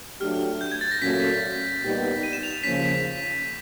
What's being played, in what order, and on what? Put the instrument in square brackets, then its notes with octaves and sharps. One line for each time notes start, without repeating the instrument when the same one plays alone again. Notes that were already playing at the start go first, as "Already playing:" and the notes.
[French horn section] F#3 A3 D4 G4 [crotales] F6
[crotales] G6
G#6
A6
A#6
[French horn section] A#2 F#3 A3 C#4 [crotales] B6
[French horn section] A#2 G3 B3 D#4 G4
[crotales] D#7
E7
F7
[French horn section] D#2 C#3 F3 A#3 C#4 [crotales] B6